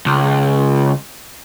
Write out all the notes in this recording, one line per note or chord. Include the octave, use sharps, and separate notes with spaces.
C#2